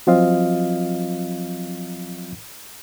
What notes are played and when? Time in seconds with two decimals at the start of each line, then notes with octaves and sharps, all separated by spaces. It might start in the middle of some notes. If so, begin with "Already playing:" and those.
0.07 F3 F#3 C4 F4 D#5 F5